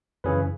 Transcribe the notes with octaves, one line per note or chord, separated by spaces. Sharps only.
F#2 C#3 E3 C#4 G#4 B4